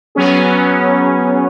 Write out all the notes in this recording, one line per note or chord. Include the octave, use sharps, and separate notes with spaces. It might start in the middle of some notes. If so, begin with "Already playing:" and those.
F#3 B3 C#4 G#4